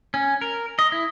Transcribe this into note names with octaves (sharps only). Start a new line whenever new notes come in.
C#4
A#4
D#5
E4